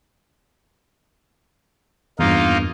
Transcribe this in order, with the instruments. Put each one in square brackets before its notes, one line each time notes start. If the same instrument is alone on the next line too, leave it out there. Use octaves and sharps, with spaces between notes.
[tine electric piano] E2 G2 [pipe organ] A#3 D#4 F4